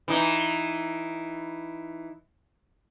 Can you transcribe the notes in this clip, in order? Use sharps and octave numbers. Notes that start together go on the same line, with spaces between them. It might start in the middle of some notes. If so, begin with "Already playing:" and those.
E3 D#4